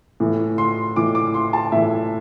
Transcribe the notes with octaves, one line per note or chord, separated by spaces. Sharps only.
A2 E3
C6
A2 E3 D6
D6
C6
A5
A2 E3 E5